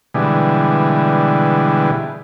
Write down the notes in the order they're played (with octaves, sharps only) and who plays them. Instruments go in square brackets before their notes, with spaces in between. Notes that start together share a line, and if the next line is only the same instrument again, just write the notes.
[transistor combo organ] B2 D3 E3 G3 G#3